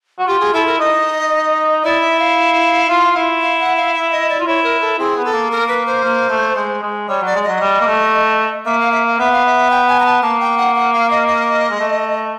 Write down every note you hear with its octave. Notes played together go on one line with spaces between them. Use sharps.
F#4
F4 G4
G#4
E4 A4
A#4
D#4 D#5
E4 D5
E5
F5
F4
E4
F5
F#5
F5
E5
D#5
D5
F4
E4 C#5
A#4
A4
C4 G#4
B3
A4
A#3
A#4
B4
C5
A#3
A3
G#3
G#3
G3 C#5
F#3 D5
G#3
F#3 D#5
G3
A#3
A3
A#3 E5
F5
E5
F5
B3 E5
F5
E5
G5
G#5
A#5
A5
A#3 A5
G5
F#5
F#5
F5
D#5
D#5
G#3
A3